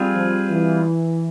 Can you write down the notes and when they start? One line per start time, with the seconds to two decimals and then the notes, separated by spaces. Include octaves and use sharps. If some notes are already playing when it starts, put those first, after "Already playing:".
Already playing: G3 C4 F4 G#4
0.12 F3
0.50 E3